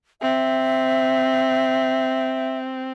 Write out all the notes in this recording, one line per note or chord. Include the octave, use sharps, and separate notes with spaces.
C4 E5